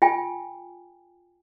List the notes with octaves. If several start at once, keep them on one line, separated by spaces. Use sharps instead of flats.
F4 G5 G#5